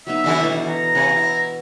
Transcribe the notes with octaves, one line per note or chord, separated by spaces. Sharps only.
F#3 B3 D#4 E5
D3 D#3 D4 F#4 A4 C#5
B2 E3
A#5
C3 F#5 G#5
E4